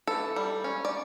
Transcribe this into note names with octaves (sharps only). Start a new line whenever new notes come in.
E3 A4
G3
C#4
D5